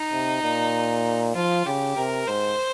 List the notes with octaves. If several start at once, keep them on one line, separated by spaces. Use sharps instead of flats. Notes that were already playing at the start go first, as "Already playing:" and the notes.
Already playing: D#4
C3
A#2
F3 F4
C#3 G4
C3 A#4
G#2 C5